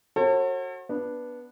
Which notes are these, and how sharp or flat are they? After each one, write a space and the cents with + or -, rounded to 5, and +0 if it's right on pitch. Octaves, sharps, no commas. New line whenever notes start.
F#4 +0 A4 +35 C#5 -45
B3 -10 D4 +0